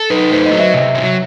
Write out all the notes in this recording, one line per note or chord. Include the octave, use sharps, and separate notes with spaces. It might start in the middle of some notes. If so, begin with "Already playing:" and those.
Already playing: A4
D#4 B4
B4
A3 C5
D#5
F#3
E5
C3
F#3